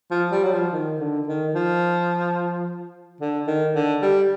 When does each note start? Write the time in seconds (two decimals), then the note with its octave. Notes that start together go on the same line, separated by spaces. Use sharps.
0.11 F3
0.31 G3
0.44 F#3
0.53 F3
0.73 D#3
1.00 D3
1.27 D#3
1.55 F3
3.21 D3
3.47 D#3
3.75 D3
4.02 G3